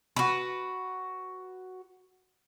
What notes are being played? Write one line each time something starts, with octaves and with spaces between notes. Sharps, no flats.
F#4 B4